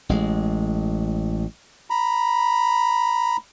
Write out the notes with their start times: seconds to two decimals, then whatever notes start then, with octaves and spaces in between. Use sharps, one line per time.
0.09 A1 G#3
1.90 A#5 B5